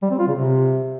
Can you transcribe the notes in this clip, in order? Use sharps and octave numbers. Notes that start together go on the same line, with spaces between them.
G3
C4
F4
C#3
C3